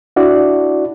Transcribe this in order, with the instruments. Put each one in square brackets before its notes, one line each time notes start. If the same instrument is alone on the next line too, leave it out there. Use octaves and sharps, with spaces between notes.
[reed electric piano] D4 E4 F#4 D5